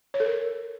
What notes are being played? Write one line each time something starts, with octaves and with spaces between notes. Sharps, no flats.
C#5
A4
A#4